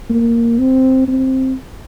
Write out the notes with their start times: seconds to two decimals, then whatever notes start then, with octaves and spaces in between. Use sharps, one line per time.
0.09 A#3
0.59 C4
1.08 C4